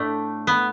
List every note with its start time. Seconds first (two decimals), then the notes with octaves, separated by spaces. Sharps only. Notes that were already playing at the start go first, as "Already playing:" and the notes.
Already playing: A2 A3 D4
0.47 B3